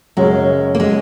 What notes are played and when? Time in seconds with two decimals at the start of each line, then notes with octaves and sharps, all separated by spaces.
0.17 F#2 C#3 F#3 G#3 C#4
0.75 A#3
0.80 G#3